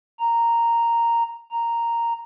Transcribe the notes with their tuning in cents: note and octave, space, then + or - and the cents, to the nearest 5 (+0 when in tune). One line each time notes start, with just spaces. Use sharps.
A#5 -5
A#5 -5